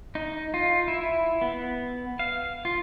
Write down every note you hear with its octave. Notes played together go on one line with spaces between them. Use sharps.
D#4
F4
E4
B3
F5
F4